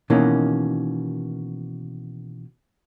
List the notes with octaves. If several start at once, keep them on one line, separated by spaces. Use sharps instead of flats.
B2 D#3 E3 A#3 C#4